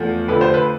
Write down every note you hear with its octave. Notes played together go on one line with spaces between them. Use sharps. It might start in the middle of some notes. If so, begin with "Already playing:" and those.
Already playing: E2 F3 A3
F2 D3 F3 A3 B4
C5
B4